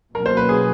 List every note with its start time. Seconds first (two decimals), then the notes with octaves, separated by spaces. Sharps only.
0.14 B2 F#3 A#3 C#4 A#4
0.26 C5
0.37 B4
0.49 G#4